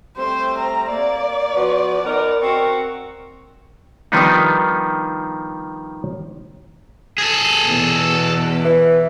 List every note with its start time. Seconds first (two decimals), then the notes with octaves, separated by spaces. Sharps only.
0.17 G3 A3 C4 C5
0.58 A#5
0.89 A#3 D5
1.54 F3 B3 F#4
2.05 B3 D#4 A#4
2.42 C4 F#4 A#4 C#6
4.12 D#3 F3 G3 B3 D4 D#4
7.18 G#4 A4
7.65 E2 B2
8.64 E3